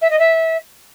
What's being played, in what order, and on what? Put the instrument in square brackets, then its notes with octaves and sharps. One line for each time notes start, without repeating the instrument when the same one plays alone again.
[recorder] E5
D#5
E5